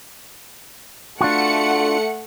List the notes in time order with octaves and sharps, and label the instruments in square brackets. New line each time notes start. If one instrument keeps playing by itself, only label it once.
[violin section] A3 F#5 C#7 [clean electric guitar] D4 F4 F#4